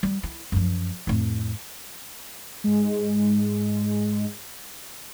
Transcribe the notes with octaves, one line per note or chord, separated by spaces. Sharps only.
G3
E4
F#2 F3
F2 A2
G#2 G#3